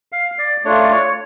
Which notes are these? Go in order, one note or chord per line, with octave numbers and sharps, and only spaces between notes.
F5
D5
A3 D4 F4 C#5
D5
C#5